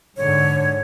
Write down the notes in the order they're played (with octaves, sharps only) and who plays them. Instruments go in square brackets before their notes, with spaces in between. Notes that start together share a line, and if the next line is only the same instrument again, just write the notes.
[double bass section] G#2 D3 [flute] C#5